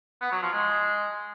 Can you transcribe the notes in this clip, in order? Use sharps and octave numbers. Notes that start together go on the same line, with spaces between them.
B3
F#3
F3
G#3